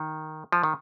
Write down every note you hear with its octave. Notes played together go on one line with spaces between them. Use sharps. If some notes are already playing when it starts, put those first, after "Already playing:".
Already playing: D#3
F3
D#3